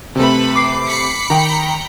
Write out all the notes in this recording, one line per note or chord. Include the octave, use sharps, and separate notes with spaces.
C3 A3 A4 B4 B5
D6 C7
B5 B6 C#7
D#3 G5 A#5